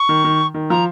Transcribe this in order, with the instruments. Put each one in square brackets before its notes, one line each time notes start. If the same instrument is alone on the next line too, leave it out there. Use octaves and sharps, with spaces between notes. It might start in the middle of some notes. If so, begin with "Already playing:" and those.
Already playing: [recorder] C#6
[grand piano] D#3
D#3
D#3
[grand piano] F3 [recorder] A#5